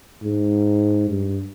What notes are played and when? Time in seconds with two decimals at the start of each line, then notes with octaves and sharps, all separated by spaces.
0.23 G#2
1.09 G2